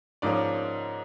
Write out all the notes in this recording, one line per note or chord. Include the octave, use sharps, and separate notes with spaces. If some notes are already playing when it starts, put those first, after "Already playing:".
G#2 F3 A#3 C#4 D5